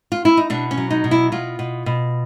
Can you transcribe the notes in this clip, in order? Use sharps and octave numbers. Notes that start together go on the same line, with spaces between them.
F4
E4
D#4
B2 D4
C#4
F#3
D#4
B2
E4
B2 F4
B2
B2